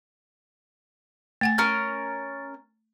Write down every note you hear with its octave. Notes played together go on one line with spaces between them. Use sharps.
A3 F#5 G#5 A6
C#4 A#4 F6